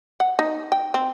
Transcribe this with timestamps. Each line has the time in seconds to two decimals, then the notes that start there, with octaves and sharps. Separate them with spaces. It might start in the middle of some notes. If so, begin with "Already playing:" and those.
0.20 F#5
0.39 D#4
0.72 G5
0.94 C4